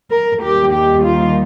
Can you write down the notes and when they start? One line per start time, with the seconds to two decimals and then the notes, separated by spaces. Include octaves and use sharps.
0.11 A#4
0.42 D#2 D#3 G3 G4
0.73 G4
1.03 F4